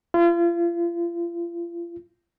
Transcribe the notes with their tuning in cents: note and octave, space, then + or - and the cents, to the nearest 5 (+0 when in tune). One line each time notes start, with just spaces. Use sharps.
F4 -35